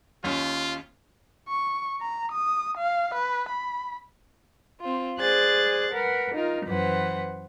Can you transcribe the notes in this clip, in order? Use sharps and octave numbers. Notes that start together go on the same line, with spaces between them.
D#2 C#4 F4
C#6
A#5
D#6
F5
B4
B5
C4 F4
G#4 C5 D5 F#6 A6
A#4 B4 F#5
D#4 F4 A#4
F#2 E3 B4 C5 F#5